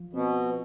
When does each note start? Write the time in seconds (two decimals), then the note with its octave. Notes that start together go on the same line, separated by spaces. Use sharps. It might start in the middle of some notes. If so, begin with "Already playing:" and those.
Already playing: F3 F4
0.13 B2 C4